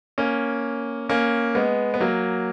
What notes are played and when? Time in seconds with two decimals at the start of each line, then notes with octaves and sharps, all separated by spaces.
0.18 A#3 C#4
1.09 A#3 C#4
1.55 G#3 B3
1.94 B3
2.00 F#3 A#3